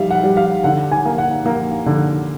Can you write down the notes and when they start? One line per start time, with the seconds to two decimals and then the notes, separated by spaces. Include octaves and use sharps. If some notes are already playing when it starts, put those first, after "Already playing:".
Already playing: G3 E5 F5
0.11 F#5
0.24 G3
0.37 F5
0.64 D3 F#5
0.92 G#5
1.05 A#3
1.18 F#5
1.46 A#3
1.86 D3